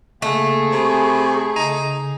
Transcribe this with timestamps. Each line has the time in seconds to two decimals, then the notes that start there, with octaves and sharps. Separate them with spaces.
0.22 C#3 A3 A#3 G#4
0.72 C3 G#5 B5 C#6
1.56 C#3 D#4